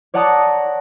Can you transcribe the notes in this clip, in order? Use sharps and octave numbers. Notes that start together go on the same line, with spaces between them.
C#5 D5 F#5 A5 A#5 D#6